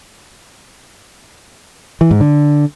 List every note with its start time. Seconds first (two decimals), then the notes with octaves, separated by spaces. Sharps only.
2.01 E3
2.11 G#2
2.21 D3